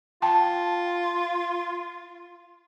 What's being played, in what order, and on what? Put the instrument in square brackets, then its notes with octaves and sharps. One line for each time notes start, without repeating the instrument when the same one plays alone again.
[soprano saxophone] F4 [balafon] G5 A5